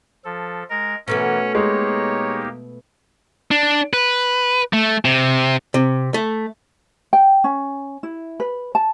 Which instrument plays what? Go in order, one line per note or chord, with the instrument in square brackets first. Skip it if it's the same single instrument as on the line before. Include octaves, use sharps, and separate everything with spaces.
[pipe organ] F3 A4
[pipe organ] G#3 [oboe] A#4
[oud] B2 A3 B3 [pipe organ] E3 A#4 [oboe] C#4
[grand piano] G#3 [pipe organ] A#3 D#4 G4 [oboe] C#5
[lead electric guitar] D4
B4
A3
C3
[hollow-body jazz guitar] C3
A3
[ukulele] G5
C#4
E4
B4
A5